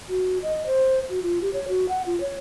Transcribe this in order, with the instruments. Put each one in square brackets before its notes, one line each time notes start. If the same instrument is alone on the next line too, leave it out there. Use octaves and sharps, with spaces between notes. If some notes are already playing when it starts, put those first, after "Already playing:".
[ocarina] F#4
D#5
C5
F#4
F4
G4
C#5
F#4
F#5
F4
C#5